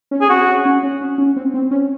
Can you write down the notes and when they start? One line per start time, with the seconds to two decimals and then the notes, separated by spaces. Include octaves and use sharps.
0.11 C#4
0.21 C#4 G#4
0.29 C4 F#4
0.47 C#4
0.65 C#4
0.83 C#4
1.01 C#4
1.18 C#4
1.37 C4
1.54 C4
1.71 C#4